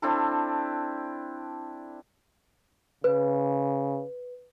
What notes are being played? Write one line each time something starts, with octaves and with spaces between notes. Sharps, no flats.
C4 D4 E4 A4
C#3 B4